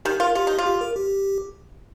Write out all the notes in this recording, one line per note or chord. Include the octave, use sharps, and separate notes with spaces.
D#3 G4
F4 A#4
F4 G4
D#4
F4
G4
A#4
G4